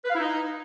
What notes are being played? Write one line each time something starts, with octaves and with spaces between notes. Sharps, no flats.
B4
F5
E4
D#4